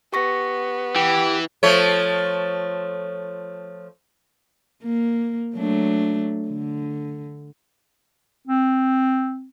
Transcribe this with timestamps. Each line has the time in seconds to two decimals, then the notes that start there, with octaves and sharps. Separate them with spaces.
0.13 B3 G4 C#6 A#6
0.96 E3 G4 G5
1.63 F3 A3 C#5
4.84 A#3
5.55 F#3 A3 D4
6.48 D3
8.47 C4